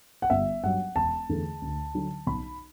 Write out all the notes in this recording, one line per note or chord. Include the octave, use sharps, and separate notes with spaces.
F#5
G1 E5
G2 F#3 F#5
E1 A5
E2 D3 A3
D2
D3 F#3
B1 B5